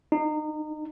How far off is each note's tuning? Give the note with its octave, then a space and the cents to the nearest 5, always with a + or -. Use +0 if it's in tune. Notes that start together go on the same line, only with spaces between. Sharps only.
D#4 -30